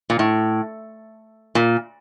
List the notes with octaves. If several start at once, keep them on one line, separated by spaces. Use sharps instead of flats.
A#2
A2
A#2